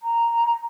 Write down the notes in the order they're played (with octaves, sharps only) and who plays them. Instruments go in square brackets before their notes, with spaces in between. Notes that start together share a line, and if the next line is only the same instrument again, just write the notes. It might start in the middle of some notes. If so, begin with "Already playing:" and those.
[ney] A#5